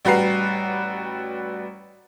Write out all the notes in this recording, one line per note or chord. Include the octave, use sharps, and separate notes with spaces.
A1 G3 F#4 B4 A#5 C7